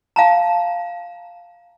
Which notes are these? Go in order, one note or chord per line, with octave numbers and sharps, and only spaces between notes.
F5 A5 A#5